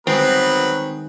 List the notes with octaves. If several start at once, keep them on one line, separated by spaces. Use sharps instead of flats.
D#3 F#3 G#3 B3 C4 B4